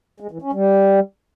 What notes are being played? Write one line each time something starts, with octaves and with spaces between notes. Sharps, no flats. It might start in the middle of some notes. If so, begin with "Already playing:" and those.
G#3
E3
C#4
G3